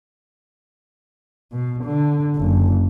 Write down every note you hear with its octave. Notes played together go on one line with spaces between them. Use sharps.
B2
D3
F#1